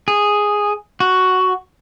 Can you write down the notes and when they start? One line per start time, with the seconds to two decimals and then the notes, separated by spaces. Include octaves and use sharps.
0.08 G#4
1.00 F#4